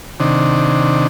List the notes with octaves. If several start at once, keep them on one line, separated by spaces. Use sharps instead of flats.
C3 D#3 D4